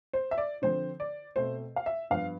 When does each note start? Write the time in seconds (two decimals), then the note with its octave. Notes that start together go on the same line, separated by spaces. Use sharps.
0.13 C5
0.31 E5
0.38 D5
0.62 D3 F3 C4 C5
1.00 D5
1.36 B2 A3 C4 C5
1.76 F5
1.86 E5
2.10 G2 F3 B3 F5